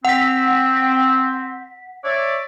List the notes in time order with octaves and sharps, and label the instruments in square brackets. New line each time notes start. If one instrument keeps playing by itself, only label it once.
[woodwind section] C4 [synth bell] F#5 B6
[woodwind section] C#5 D5 E5